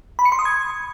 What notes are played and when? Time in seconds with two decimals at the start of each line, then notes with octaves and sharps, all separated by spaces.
0.19 B5
0.25 C#7
0.32 C6
0.39 D#6
0.45 G#6